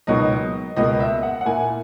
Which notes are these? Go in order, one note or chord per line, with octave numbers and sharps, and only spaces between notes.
C#2 B2 F#3 A#3 D#4 D#5
C#2 B2 A#3 D#5
E5
F#5
F#5
A#2 A#3 E4 G#5